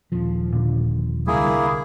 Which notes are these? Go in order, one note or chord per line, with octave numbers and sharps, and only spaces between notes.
D#1 F3
A#2 D3
C2 D3 G3 A#3 E4 G#4